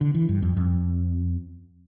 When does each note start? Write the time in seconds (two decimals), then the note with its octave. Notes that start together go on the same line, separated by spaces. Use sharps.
0.01 D3
0.14 E3
0.29 G2
0.42 F2
0.57 F2